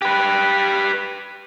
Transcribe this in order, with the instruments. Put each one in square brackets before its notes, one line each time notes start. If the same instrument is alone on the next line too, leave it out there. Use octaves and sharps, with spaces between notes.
[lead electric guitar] G4 B4